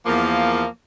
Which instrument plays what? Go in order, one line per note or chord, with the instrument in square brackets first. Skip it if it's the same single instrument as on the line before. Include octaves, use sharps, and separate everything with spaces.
[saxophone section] E2 F3 A#3